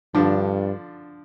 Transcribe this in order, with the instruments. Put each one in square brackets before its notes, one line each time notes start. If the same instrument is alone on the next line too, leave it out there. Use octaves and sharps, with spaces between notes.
[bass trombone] G2 [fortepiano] D3 F3 D4